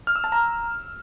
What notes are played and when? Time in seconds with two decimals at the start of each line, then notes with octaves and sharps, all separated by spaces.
0.07 F6
0.16 E6
0.24 A5
0.32 A#5